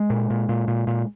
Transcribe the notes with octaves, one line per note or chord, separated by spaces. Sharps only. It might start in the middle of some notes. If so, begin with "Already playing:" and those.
Already playing: G#3
A#2
A#2
A#2
A#2
A#2